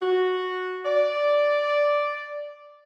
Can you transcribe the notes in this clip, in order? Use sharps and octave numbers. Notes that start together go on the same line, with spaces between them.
F#4
D5